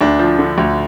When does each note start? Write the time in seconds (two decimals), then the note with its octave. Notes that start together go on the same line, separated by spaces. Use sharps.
0.01 D2 D4
0.19 F3
0.39 D3
0.58 D2